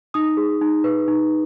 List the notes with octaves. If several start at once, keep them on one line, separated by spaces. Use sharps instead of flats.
D#4 D#6
G#4
D#4
B4
D#4